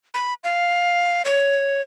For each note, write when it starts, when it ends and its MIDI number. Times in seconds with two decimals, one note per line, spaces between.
0.14 0.34 83
0.44 1.22 77
1.25 1.81 73